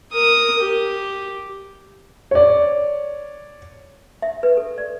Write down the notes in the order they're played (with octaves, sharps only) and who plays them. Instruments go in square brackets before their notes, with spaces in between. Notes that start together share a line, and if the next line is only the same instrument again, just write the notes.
[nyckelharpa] A#4 D#6
G4
[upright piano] C#5 D5
[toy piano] E5
B4
A4
D5